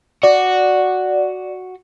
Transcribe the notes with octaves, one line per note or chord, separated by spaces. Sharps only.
F#4 D5